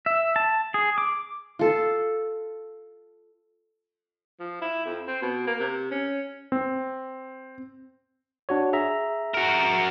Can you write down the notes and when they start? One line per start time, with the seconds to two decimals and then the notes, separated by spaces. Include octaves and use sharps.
0.06 E5
0.36 A5
0.74 G#4
0.98 D6
1.59 F4 A4
4.40 F3
4.61 E4
4.85 F2
5.08 C4
5.22 B2
5.47 A#3
5.59 C3
5.91 C#4
6.52 C4
8.49 D4 F#4 C#5
8.73 G#4 E5 A#5
9.34 F#4 A#4